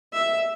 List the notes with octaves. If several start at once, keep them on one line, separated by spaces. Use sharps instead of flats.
E5